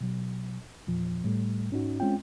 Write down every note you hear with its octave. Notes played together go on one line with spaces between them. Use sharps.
B2 F#3
E2 A#2 F3
A2 G3 A3
G#2 C#4 D#4 F#4
G#3 C4 C#4 F4 G5